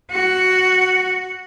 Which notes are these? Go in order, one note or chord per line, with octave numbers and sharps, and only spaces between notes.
F#4